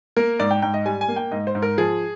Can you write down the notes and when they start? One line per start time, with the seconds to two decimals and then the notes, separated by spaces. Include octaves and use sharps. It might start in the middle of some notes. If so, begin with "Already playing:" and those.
0.16 A#3 A#4
0.39 G#2 D5
0.51 G5
0.62 G#2 G5
0.74 D#5
0.86 G3 G#5
1.01 G#5
1.08 A#3
1.16 G5
1.32 G#2 D#5
1.47 C5
1.55 G#2
1.62 A#4
1.78 F3 G#4